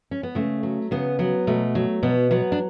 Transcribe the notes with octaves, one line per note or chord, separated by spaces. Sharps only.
C#4
B3
C#3 A3
F#3
C#3 B3
F#3 B3
B2 A3
F#3
B2 B3
F#3 B3
D4